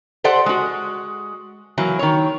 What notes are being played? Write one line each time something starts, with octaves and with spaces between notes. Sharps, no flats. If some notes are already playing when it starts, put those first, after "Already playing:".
G4 A4 C5 D5 F#5
G#3 F#4
E3 F#3 A#3
D#3 C#5